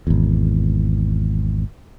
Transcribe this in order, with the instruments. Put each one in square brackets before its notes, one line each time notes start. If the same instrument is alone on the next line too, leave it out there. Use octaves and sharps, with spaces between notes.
[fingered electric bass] G#1 E2